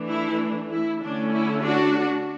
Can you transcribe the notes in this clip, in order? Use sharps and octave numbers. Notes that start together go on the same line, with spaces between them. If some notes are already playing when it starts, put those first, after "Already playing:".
Already playing: E3 A3 D4
E4
E4
D3 A3 C#4 D4
E4
D4 F#4